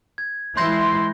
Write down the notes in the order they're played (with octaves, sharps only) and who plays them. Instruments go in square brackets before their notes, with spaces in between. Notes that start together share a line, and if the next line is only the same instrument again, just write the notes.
[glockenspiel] G#6
[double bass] E3 G#3 [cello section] E4 [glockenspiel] B5 G6 A#6 [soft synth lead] C6